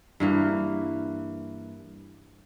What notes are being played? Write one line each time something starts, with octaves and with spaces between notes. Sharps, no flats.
G2 E3 A#3